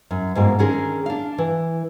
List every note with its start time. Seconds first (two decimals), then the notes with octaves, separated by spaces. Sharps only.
0.11 F#2
0.35 G#2 B2 A#3
0.58 D3 D#3 C#4 G#4 A#4
1.06 D4 F5
1.38 E3